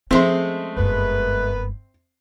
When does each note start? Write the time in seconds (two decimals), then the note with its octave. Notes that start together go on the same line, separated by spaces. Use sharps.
0.11 F3 G#3 A3 C4 C#4 E5 C6
0.77 F#1 G2 B3 A#4 B4